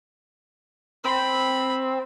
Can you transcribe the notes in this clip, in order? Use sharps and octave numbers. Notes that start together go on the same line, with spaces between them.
C4 B5